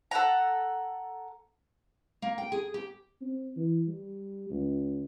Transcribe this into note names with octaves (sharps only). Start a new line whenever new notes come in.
A4 F#5 A#5
A#3
G5
G#4
G4
C4
E3
G3
C#2